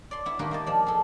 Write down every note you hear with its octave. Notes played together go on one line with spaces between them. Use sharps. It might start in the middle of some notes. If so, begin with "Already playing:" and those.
D5 C6
B3 E4
D#3 G3 A#3 D#4 G4 B4
A#3 D#5 A5
F3 D5
G#4 A4